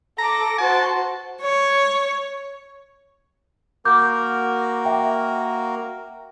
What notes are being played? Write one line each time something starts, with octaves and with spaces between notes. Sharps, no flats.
A4 A#5 D6
F#4 C5 A5
C#5
A#3 F#4 A#4 D6 G6
E5 G5